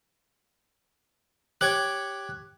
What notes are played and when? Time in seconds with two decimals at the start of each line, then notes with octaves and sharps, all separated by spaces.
1.61 G4 C#5 G5 F#6 G#6